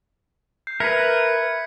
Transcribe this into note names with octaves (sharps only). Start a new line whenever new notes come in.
G6 C7
A#4 B4 E5 B5 F#6 G#6 B6 C#7